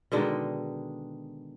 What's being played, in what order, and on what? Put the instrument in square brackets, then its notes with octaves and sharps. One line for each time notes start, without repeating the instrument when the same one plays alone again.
[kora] B2 D3 D#3 G#3